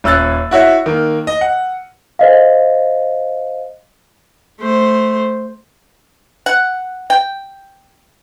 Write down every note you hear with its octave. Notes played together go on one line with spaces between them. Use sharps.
D#1 C#4 E6 F#6 A6
E4 F#4 C#5 E5
D#3 A#3
D#5
F#5
C5 D#5 F5
A3 C5
F#5
G5